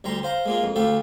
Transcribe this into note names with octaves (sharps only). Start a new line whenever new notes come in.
D2 G3 A#5 C6
C5 F5 A#5
G#3 A#3 F4
F2
D2 A3 G4 A4 F5